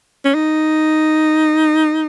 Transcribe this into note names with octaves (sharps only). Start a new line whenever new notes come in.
C#4
D#4